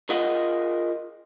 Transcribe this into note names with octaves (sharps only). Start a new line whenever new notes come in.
F4 G#4 A#4 D#5 F5 F#5